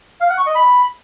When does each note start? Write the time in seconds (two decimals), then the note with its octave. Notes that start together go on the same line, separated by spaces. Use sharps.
0.21 F5
0.29 F#5
0.38 C#6
0.46 D#5
0.55 B5